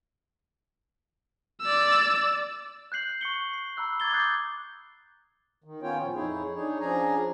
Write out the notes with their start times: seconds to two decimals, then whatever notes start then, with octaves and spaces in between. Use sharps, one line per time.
1.62 D5 E6
2.92 F#6 G6 C7 F#7
3.21 C#6 C7 C#7 G7
3.54 C7
3.77 A#5 B5 E6 F#6
4.00 D6 F#6 G#6 A6 G7
4.13 D6 D#6 F#6 G6 A6 C7
5.64 D#3
5.83 B3 C#4 F4 C#5 G5
6.02 A#2 F3 C#4
6.15 F2 D#4 E4 G#4 C#5
6.55 D4 D#4 G#4 C#5
6.80 F3 C#4 D4 G#4 G#5 A#5